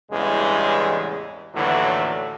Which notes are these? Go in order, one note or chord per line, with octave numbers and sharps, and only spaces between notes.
A1 E2 G2 C#3 G#3
D#2 A2 D3 E3 F#3